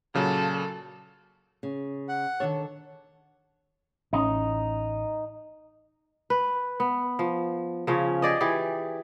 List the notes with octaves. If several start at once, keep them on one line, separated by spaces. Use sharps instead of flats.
A#2 C#3 F#3 A4
C#3
F#5
D#3 D4 A4 C#5
A1 C#4 D#4
B4
B3
F3
C#3 F3 C#4
G4 G#4 D5 D#5
E3 G4 G#4